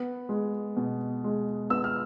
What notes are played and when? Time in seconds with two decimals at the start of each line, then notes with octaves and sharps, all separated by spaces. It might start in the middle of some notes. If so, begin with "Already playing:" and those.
Already playing: B3
0.29 G#3
0.77 B2
1.24 G#3
1.70 B3 E6
1.84 F6